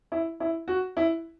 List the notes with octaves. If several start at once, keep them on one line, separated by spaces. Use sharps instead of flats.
E4
E4
F#4
E4